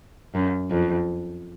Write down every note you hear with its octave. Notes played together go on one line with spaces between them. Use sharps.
F#2
F2